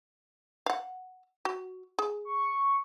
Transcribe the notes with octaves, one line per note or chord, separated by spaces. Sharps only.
F5 F#5
F#4
G#4
C#6